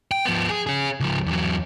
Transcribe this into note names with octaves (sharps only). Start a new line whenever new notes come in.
G5
F3 B3
G#4
C#4 G#4
C#2 F3
E2 F#3